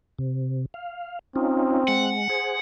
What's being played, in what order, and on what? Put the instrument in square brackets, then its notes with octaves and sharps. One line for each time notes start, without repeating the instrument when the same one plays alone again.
[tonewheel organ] C3
F5
[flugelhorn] C4 [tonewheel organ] C#4 D#4 F4
[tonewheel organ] G#3 [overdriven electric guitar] F#5
[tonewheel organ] G#4 C5